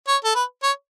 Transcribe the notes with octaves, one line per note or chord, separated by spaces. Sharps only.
C#5
A4
B4
C#5